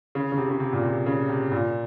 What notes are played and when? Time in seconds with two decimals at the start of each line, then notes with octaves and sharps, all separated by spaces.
0.15 C#3
0.32 C#3
0.38 C3
0.50 C#3
0.60 C3
0.73 A#2
0.83 C3
1.06 C#3
1.29 C3
1.51 A#2